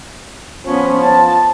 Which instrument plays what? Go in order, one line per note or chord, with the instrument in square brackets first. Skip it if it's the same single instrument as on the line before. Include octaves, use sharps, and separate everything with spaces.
[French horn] F3 [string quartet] B3 C#4
[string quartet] A5